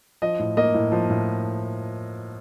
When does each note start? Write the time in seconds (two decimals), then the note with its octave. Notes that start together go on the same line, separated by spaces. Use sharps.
0.22 F3 D#5
0.39 A2
0.57 A#3 D#5
0.74 A2
0.92 F3
1.10 A2